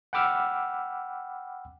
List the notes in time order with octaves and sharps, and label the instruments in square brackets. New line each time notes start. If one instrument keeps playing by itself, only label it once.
[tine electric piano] F#5 G5 B5 D6 E6 F6